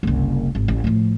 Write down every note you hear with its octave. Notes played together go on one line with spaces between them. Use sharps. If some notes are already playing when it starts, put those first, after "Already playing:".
F#1 C2
G#1
A1
A2 F3